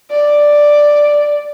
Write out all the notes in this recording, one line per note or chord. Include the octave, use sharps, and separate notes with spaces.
D5